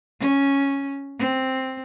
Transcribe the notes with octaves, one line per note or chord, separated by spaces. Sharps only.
C#4
C4